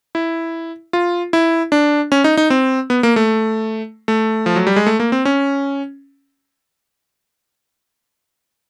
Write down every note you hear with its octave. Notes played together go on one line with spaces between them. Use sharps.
E4
F4
E4
D4
C#4
D#4
D#4
C4
B3
A#3
A3
A3
F3
F#3
G3
G#3
A3
A#3
C4
C#4